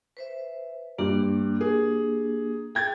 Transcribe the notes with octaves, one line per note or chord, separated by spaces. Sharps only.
B4 C5 E5
G2 A#3 D4 G4
G#4
G#4 G5 G#6 A6